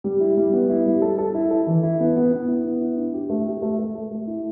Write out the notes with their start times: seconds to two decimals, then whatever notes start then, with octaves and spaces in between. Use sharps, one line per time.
0.04 G3
0.20 E4
0.37 G3
0.53 B3
0.69 E4
0.86 G3
1.02 A4
1.18 A4
1.34 E4
1.51 A4
1.67 E3
1.83 E4
2.00 B3
2.17 B3
2.33 B3
2.48 E4
2.65 B3
2.81 E4
2.97 D4
3.14 G4
3.30 A3
3.46 G4
3.62 A3
3.79 A3
3.95 A4
4.11 A3
4.27 E4